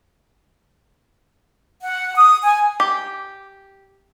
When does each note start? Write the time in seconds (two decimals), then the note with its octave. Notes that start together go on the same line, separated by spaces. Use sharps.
1.83 F#5
2.15 D#6
2.43 G#5
2.80 G4